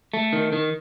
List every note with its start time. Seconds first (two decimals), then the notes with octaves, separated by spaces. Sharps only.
0.14 A3
0.33 D#3
0.53 D#3